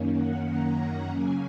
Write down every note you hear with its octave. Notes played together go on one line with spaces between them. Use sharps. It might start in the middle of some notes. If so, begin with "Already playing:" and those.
Already playing: F#2 D#3 A#3 C#4
F#5
A#5
A#5
C#3 F#3 A#3 C#4 G#5